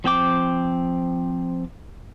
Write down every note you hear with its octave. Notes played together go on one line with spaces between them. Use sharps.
F3 C4 G5 D6